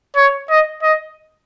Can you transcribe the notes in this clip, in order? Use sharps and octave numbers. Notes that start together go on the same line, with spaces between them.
C#5
D#5
D#5